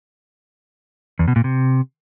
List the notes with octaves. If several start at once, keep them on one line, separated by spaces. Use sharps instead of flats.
E2
B2
A#2
C3